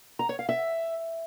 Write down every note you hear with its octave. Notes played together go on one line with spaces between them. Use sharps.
A#5
C#5
F5
E5